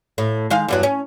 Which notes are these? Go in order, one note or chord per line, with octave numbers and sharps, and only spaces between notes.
A2
D#3 G#3 F5
E2 G2 F#3
C#4